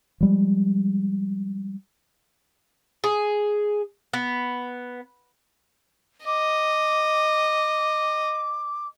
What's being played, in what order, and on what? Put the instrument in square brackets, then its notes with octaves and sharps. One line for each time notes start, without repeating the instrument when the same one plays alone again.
[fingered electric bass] F3 G3 G#3
[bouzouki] G#4
B3
[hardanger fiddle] D#5 [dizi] D6